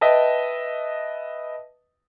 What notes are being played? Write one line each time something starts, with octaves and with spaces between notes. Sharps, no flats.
B4 D#5 E5 G5 A5